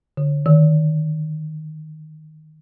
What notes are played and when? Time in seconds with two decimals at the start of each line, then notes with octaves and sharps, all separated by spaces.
0.17 D3
0.46 D#3